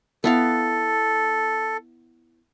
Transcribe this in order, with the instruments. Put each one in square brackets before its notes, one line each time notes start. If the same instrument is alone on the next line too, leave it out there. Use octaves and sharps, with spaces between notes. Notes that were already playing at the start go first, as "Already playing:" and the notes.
[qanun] B3 E4 F5 [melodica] A4